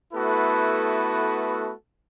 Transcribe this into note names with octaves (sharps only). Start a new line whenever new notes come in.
A3 B3 E4 F#4 A4 B4